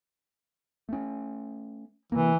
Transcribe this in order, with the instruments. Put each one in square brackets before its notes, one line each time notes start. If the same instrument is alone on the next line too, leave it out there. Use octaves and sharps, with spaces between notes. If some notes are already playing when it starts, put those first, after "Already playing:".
[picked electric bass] A3 C#4
[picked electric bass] C3 A#3 [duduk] E3